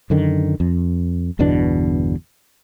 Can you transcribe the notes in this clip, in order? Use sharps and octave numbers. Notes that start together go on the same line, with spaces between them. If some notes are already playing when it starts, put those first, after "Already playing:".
F#2 D3 D#3
F2
G1 E2 B2 D4